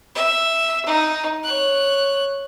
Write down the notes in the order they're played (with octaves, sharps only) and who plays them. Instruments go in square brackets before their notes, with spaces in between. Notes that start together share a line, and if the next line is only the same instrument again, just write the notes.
[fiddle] E5
D#4
C#5 F#6